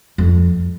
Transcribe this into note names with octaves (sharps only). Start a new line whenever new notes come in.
F2